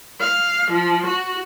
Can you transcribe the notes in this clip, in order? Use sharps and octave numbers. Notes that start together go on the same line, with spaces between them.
F5
F3
F#4